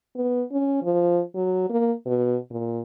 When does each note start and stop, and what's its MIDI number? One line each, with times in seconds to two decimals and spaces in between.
0.15 0.43 59
0.52 0.80 61
0.83 1.21 53
1.35 1.66 54
1.70 1.93 58
2.06 2.37 47
2.50 2.81 46